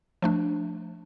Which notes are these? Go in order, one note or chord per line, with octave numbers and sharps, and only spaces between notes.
F3 A3 D4